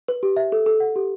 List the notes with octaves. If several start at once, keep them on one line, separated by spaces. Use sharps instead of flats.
B4
G4
E5
A4
A4
F#5
G4